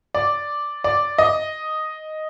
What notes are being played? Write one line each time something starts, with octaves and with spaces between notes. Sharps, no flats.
D5
D5
D#5